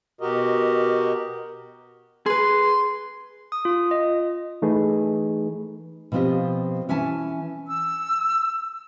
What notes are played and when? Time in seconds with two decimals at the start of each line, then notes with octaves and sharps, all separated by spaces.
0.21 B2 F#4 G4 A#4 D#5
2.26 G#4 B4 C6
3.52 D#6
3.65 F4
3.91 D#5
4.62 E3 A3 D#4 G#4 B4
6.12 B2 F3 C4 F4 G4 D#5
6.89 E3 C#4 E5 G#5 A5
7.67 E6